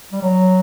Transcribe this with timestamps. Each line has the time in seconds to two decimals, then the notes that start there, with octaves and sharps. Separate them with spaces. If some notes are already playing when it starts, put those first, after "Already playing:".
0.13 G3
0.22 F#3